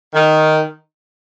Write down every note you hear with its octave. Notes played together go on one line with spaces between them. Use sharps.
D#3